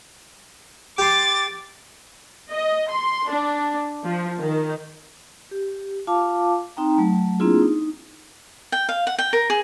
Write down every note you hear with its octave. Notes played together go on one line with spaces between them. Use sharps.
G4 C6 D6 A6
D#5
C6
D4
F3
D#3
G4
F4 F5 A5 D6
C4 D#4 G5 A#5
F#3 A3
A#3 C4 D4 E4 F4 G#4
D#4
G5
F5
F#5
G5
A#4
G#4